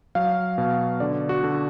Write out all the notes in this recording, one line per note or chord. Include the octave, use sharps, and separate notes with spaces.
F#3 F5
B2
D3 D5
F#4
D3